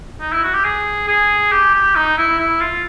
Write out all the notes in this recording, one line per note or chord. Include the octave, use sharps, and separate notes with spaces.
D#4
E4
F#4
G4
G#4
G#4
G4
G4
D#4
E4
E4
F4